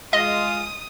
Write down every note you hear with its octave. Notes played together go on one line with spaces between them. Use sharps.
G#3 F4 D#5 D#6